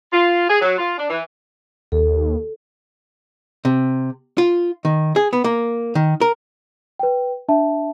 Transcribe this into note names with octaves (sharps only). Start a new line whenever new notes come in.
F4
G#4
F#3
F4
D4
E3
D#2 A4
C3
F4
D#3
G#4
B3
A#3
D#3
A#4
B4 G5
D4 E5 A5